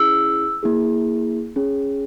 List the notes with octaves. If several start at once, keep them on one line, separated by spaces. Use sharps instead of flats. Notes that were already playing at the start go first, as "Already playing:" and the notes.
Already playing: C#4 E4 G#4 E6
A#3 E4 G#4
C#4 G#4